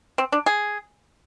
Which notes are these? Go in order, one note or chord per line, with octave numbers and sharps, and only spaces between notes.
C4
D4
G#4